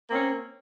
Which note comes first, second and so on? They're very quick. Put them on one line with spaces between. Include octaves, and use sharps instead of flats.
A#3 C4 C#4